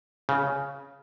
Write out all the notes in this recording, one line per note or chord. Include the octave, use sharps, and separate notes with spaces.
C#3